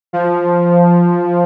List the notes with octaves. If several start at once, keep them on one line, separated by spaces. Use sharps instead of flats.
F3